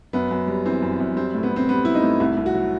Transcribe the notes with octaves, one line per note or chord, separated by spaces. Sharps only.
F#2 B3
F#2
G3
E3 C4
F#2
F#2
G3 C4
A2
B3
A2
C4
G3 B3
G3 E4
D#4
A2
C2 E4
C2
F#4
F#3